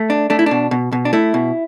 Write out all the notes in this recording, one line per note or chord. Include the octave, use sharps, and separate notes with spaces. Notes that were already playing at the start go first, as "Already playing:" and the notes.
Already playing: A3
D4
A3 D4
E4
B2 D4
B2
B2
D4
A3 E4
B2